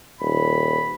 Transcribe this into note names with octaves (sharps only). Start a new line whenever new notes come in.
D#1 B5